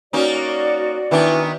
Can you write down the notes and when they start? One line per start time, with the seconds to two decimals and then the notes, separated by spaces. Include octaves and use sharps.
0.13 A#3 C#4 D#4 F#4 D5
1.11 D#3 E3 B3 D4